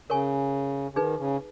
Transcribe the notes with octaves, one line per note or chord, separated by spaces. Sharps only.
C#3 A#4 C#5 G#5 C#6
C#3
D#3 D#4 G#4 B4
C#3